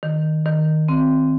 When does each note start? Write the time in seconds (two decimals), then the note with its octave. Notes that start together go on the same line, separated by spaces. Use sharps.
0.03 D#3
0.46 D#3
0.88 C4